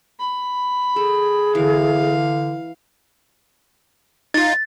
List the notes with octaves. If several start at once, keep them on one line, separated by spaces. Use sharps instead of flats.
B5
G#4 A4
D3 E3 F5
D#4 F4 A6